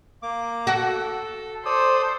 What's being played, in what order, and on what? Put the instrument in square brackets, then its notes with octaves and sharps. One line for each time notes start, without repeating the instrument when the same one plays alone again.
[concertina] A#3 D6
[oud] F#4 [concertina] A4
[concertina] A4 D5 D#6 [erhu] C5